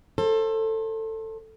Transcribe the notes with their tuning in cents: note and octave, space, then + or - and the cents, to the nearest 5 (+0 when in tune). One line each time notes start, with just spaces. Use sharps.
A4 +15 C5 +35